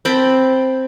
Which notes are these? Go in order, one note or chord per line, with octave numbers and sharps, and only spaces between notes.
C4 G5 A5 B5